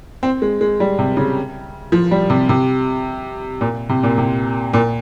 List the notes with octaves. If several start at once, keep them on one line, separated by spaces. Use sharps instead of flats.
C4
G#3
G#3
G3
C3
C#3
F3
G3
C3
C3
A#2
C3
A#2
C3
A#2